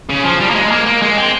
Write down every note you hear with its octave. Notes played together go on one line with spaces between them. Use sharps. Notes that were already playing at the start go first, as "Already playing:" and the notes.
C#3
F3
G3
A#3
G#3
A#3
A#3
G#3
C4